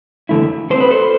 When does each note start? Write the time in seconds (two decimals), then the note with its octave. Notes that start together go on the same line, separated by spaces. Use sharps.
0.29 F2 D3 A3 E4
0.70 D3 A3 C4 C5
0.80 B4
0.91 A4 C5